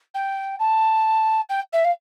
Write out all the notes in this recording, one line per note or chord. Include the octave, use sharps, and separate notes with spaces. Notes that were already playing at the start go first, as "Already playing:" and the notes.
G5
A5
G5
E5
F5